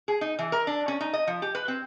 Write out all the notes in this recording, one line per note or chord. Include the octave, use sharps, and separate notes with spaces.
G#4
D#4
E3
A#4
D4
C#4
D#4
D#5
F3
G4
B4
C4